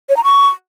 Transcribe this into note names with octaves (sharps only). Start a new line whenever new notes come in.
C#5
A#5
C#6